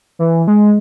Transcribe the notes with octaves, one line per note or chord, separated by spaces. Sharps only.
E3
G#3